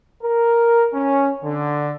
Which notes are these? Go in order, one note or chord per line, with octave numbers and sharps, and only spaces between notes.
A#4
C#4
D3